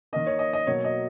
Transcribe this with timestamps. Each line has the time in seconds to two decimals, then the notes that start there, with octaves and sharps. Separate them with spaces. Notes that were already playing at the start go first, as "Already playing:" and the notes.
0.13 D#3 A#3 D#5
0.27 C#5
0.39 D#5
0.53 D#5
0.67 B2 F#3 A#3 C#5
0.84 D#5